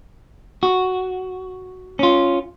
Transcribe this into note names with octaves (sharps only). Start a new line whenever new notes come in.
F#4
C#4 F4